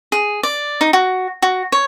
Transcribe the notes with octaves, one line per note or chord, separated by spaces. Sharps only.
G#4
D5
D#4
F#4
F#4
C#5